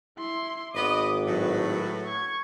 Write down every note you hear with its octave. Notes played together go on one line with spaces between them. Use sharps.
E4 C6
G#1 B3 B4 D#5 D6 D#6
A2 F#3 B4
C#6 G#6